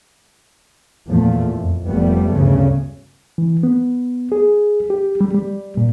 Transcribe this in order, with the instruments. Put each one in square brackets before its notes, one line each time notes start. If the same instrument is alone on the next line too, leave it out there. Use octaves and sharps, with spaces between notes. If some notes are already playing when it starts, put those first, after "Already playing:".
[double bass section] E2 A#2 F3 A3
F2
F1 F3 G3 A3 B3
G1 D2 C#3
[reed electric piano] E3
B3
G#4
G4
G3
G3
A#2